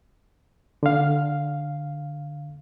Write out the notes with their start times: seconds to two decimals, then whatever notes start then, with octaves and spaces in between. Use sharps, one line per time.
0.83 D3 F5